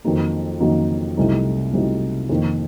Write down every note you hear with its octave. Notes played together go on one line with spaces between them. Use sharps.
F2 D#3 F#3 A#3 D#4
F2 D#3 F#3 A#3 D#4
C2 C3 F#3 A3 D#4
C2 C3 F#3 A3 D#4
F2 D#3 A#3